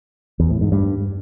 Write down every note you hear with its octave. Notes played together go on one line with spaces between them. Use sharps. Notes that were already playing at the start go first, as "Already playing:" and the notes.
E2
A2
G#2
G2